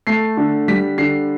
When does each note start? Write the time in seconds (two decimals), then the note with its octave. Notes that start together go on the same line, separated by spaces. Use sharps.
0.07 A3 C7
0.37 D3
0.68 G3 B6
0.98 D3 C7